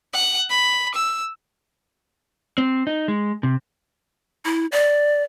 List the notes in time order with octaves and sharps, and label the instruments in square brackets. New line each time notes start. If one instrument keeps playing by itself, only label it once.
[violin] F#5
B5
E6
[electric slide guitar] C4
D#4
G#3
C3
[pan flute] E4
D5